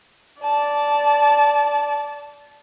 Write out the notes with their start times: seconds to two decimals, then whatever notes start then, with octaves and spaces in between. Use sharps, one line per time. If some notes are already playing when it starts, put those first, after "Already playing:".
0.42 D5 A5